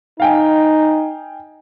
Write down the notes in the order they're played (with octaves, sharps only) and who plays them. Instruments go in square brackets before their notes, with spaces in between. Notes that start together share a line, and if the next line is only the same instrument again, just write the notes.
[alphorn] D#4 [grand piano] F5 G5 G#5